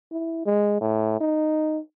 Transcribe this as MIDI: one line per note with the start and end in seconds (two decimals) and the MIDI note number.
0.12 0.44 64
0.46 0.80 56
0.81 1.19 45
1.21 1.79 63